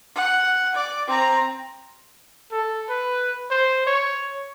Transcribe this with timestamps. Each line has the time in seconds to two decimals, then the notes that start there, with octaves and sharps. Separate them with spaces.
0.15 F#5
0.75 D5
1.07 C4 A#5
2.51 A4
2.89 B4
3.51 C5
3.87 C#5